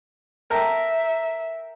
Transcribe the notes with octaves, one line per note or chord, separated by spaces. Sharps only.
A4 A#4 E5 G5